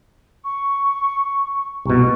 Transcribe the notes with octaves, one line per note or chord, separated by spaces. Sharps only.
C#6
C2 B2 C#6